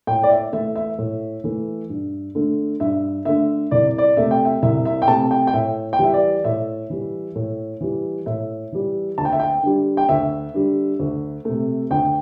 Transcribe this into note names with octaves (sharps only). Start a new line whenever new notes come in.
A2 G5
D5
E5
E3 A3 E5
E5
A2
E3 A3
G2
D3 A3
G2 E5
D3 A3 E5
C2 D5
D5
C3 A3 E5
G5
E5
C2 E5
E5
G5
C3 A3 A5
G5
G5
A2 E5
G5
E3 G3 E5
D5
A2 E5
E3 G3
A2
E3 G3
A2 E5
E3 G3
D2 A5
G5
E5
G5
D3 G3
G5
D2 E5
D3 G3
D2
C3 A3
D2 G5